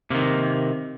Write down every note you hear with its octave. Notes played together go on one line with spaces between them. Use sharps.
C3 D#3 A#3